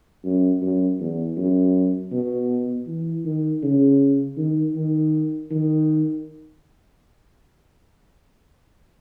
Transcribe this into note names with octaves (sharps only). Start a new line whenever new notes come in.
F#2
F#2
E2
F#2
B2
E3
D#3
C#3
D#3
D#3
D#3